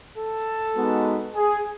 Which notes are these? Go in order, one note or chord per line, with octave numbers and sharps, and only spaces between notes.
A4
G#3 B3 D#4 F#4
G#4